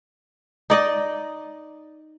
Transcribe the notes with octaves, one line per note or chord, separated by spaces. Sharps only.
D#4 D5 D#5